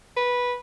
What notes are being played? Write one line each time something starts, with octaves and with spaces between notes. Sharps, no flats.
B4